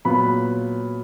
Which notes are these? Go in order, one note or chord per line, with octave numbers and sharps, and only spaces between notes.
A#2 F#3 B3 B5